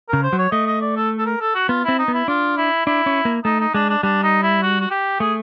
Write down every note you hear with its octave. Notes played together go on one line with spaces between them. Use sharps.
C#3 A#4
C5
F#3
C#5
A3 D#5
D#5
D5
A4
A4
A#4
A4
F#4
B3 F4
C4 E4
D#4
B3
E4
D4 F4
E4
D4 E4
C#4
A#3
A3 D#4
D#4
G#3 D4
D4
G3 D4
D#4
E4
F#4
F#4
G4
A3 G#4